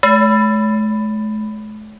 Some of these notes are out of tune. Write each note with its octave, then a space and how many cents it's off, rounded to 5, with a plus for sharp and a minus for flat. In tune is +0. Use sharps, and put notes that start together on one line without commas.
A3 -45